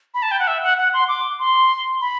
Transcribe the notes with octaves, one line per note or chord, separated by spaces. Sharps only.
B5
A5
G5
F#5
E5
F#5
F#5
C6
D6
C6
B5